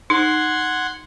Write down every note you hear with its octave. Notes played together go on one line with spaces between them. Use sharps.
D#4 F#5 C6 G#6